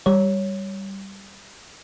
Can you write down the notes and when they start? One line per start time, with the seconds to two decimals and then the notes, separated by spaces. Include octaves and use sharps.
0.06 G3 C#5